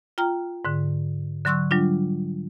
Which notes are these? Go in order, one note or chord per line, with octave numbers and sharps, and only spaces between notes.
F4 G5 A#5 F6
G#2 D3
D3 F#3 C6 C#6 E6 F#6
F#3 G3 D4 F4